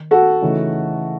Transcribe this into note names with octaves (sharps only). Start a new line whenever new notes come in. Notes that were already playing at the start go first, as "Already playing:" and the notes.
Already playing: D#3
F#4 A4
C#3 E3 A3 D#4